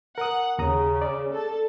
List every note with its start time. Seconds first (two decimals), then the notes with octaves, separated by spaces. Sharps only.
0.18 A#4 F#5 D#6
0.59 D#2 C#3 A#5 D#6
1.02 D5
1.33 A4 A5